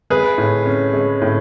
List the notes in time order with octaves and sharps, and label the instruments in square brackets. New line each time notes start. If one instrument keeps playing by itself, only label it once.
[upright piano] G#3 G#4 B4
A2
C#4
G#3
A2